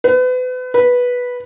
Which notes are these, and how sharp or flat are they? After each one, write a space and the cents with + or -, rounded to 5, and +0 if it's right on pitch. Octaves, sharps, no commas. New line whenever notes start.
B4 +35
B4 -10